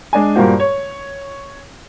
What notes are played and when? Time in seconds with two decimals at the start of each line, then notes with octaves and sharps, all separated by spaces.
0.13 G#3 D4 G#5
0.35 G2 A#2 A#3 F#4 C5
0.60 C#5